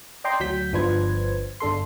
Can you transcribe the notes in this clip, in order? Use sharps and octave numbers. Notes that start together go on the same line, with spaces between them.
D5 D#5 G5 A#5 C6
D2 F#3 G6 B6
G1 F3 D4 B4 C5 G#6
G1 D4 A4 C6